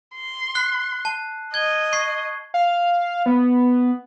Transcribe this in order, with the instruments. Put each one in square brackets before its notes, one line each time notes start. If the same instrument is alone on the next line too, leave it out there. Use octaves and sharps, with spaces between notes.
[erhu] C6
[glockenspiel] F#6 C7
A5
[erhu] D#5 [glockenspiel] G#6 G7
[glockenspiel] C#6 G#6 C7
[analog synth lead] F5
B3